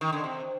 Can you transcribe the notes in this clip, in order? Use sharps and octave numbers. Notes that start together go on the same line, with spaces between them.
D#3
D3
C3